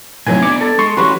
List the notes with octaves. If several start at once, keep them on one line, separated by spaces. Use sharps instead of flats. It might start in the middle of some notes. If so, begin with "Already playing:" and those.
B1 A2 C3 E3 F#3 G#5
B3 D4 D6 G#6 C#7
A4
G#3 C6 C#6
E3 G3 C#4 F#4 B4